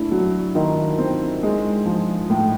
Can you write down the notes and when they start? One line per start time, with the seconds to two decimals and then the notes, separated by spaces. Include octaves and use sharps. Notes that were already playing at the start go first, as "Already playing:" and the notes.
Already playing: A3 D4 E4
0.11 F#3
0.55 D#3 D#4 F4
0.98 C4
1.43 G#3
1.86 F3
2.30 A2